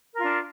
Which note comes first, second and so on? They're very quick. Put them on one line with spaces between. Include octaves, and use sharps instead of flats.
A#4 F4 D4